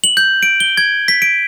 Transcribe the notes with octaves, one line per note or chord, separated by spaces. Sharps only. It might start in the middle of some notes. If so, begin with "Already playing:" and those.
F#7
G6
D7
G7
G#6
B6
D7